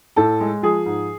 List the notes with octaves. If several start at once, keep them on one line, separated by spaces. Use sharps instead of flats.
A2 A4
G#3
F3 G#4
G#2